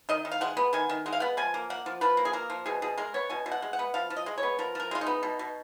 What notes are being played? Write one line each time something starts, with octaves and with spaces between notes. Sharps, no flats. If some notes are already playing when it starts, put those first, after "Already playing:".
D#3 D#5
D#3
F5
G#3 F#5
B3
D#3 G#5
D#3
G#3 F#5
F5
B3 F#5
F3 G#5
A#3
A#3 F#5
F3
F3 B4
A#3
G#4
A#3 A#4
F3
B2 G#4
B2 G#4
G#3 A#4
B3 C#5
B2 G#5
B2
F#5
G#3
F#5
B3
F3 F5
F3
D#5
G#3
C#5
B3
F3 A#4
F3 A#4
G#3 F4
D#4
B3
B2
B2